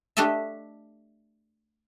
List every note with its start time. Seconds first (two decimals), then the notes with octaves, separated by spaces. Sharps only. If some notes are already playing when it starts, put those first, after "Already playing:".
0.17 A3 D4 G4 A4 D#5 E5